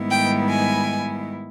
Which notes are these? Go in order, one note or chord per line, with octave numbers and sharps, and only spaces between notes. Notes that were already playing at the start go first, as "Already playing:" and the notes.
Already playing: G#2 D#3 G3 B3 E4
G5
G#5